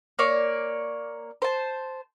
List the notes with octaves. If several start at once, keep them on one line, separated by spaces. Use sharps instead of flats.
A#3 C#5 D5
C5 A5